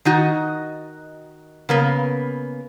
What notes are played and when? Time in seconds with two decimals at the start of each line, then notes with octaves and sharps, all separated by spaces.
0.05 D#3 D#4 F#4
1.69 C#3 A#3 B3